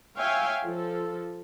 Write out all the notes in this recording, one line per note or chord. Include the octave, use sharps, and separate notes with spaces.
C#5 E5 F5 G5 G#5
F3 A4